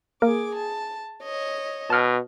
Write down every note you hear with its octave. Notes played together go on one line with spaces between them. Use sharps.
A#3 G#4 A#4 D6
A5
C#5 D#5
B2 A5 F6